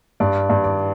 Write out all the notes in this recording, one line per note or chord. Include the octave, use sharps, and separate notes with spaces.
G2 D5
G2
D5